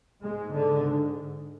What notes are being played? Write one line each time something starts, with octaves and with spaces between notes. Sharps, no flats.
G#2 G#3
D3